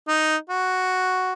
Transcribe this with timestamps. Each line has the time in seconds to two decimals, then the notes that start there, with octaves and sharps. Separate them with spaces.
0.08 D#4
0.50 F#4